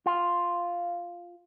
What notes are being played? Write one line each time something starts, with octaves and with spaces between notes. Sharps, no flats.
F4